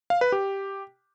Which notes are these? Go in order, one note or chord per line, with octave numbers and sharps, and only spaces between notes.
F5
B4
G4